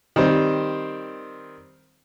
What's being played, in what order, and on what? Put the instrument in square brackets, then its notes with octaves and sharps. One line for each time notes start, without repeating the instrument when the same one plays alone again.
[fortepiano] D#3 G3 C4 C5